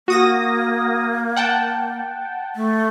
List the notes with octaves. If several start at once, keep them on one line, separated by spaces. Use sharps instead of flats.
A#3 F#4 D#6 A#6
F#5 G5 A5
A3